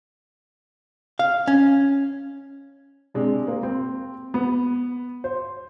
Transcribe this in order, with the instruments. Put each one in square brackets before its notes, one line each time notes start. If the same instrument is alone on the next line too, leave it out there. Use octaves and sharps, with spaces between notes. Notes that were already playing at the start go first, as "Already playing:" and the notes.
[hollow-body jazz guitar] F5
C#4
[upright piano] C3 G#3 D4
A#3
C4
B3
C5